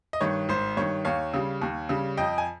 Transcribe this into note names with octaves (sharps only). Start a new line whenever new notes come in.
D#5
G2 D#3 C#5
G#1 C5
G2 D#3 C#5
D#2 C#5 F5
C#3 G3
D#2
C#3 G3
F2 D#5 G5
G#5